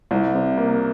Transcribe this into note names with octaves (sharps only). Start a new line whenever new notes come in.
C2
C3
A#3